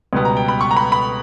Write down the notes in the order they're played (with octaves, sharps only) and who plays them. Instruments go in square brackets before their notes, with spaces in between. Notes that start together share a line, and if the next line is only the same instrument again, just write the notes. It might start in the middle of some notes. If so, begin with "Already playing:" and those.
[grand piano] C#2 B2 G3 B3
A#5
G5
B5
C#6
A#5
B5
B5